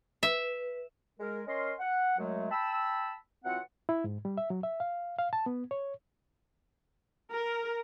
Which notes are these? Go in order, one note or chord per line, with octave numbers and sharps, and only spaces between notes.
B4 E5
G#3 A#4
C#4 A#4 D#5 C6
F#5
F#2 F#3 G#3 A3
G5 A5 B5 E6
E3 F#3 C4 F4 F#5
E4
G#2
G3
E5
F#3
E5
F5
F5
A5
B3
C#5
A#4